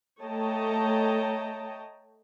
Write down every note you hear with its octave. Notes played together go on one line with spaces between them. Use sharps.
A3 C#5 D#5 G5 A5 A#5